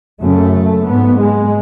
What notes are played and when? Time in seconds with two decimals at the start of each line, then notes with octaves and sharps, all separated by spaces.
0.21 F#2 C#3 A3
0.87 G#2 B3
1.19 G#3